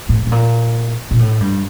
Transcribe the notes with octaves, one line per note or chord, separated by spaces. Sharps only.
A2
A2
A#2
A#2
A2
G2